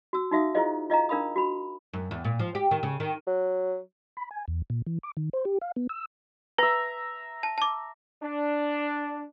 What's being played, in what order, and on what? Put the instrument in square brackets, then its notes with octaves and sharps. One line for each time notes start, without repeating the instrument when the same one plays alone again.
[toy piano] F#4 E6
D#4 F#4 E5 F5 D#6
E4 F4 G#4 C5 D#5 F5
F4 D#5 F5 A#5
D4 A#4 F5 B5 D#6
F#4 B5
[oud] F#2
E2
A#2
F3
G4
D#3
C#3
D#3
[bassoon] F#3
[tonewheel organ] B5
G#5
E2
A#2
E3
D6
D#3
C5
G4
F5
B3
E6
[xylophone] B4 [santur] E5 A#5
[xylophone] A5
A5 D6
[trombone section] D4